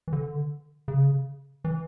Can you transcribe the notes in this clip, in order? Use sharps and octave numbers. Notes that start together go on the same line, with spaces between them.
E3
D3
C#3
E3